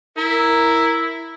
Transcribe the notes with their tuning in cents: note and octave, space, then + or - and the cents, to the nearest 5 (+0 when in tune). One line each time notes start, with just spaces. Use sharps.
E4 +0 A#4 +0